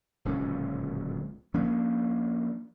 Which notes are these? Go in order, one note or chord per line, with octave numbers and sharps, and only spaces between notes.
D1 C#2 A#2 C#4
F3 A#3 C#4 D4